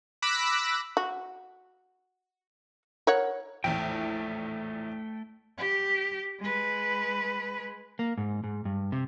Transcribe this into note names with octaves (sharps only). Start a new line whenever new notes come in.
B5 D6 E6 F#6 A#6 B6
F#4
A#4 C#5 F#5
A#1 E2 A2 A3 G5
G4
G#3 B4
A#3
G#2
G#2
G2
C3